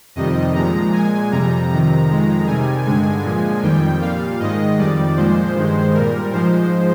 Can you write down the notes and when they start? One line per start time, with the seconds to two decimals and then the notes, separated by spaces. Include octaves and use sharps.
0.16 F2 C3 D#3 G3 D#5
0.55 A#2 F3 G#3 A#5
0.93 A#2 G#3 G#5
1.31 F2 C3 G3 A#5
1.70 F2 C3 D#3 A#5
2.08 F2 D#3 G#3
2.47 C3 D#3 G3 G#5
2.85 G2 D3 G#3 G#5
3.24 A#2 F3 G#3
3.63 F2 D#3 G3 G5
4.01 A#2 G3 F5
4.40 G#2 D#3 G#3 D#5
4.78 F2 D#3 G3 D5
5.17 A#2 F3 G#3 C5
5.55 G2 D#3 G#3
5.94 A#2 G3 A#4
6.33 G#2 F3 G#3 C5